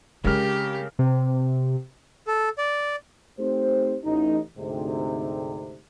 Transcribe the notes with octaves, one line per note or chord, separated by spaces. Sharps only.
C#3 G#3 C4 G4 A#4 F6
C3
A4
D5
A3 C4 D#4 G4 C5
A1 D#4
D2 G#2 C3